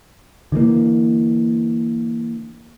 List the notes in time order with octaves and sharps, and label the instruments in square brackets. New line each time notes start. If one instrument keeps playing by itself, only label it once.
[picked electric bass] D3 E3 G3 A#3